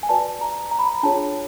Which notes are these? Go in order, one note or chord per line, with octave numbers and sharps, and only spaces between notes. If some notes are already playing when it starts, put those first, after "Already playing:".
G#5
F#4 B4 D5 A5
A#5
A#5
B5
A#5
D4 F4 G#4 C#5 A5